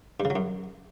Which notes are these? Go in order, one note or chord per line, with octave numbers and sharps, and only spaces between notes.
G2
C#3
F#3
F#2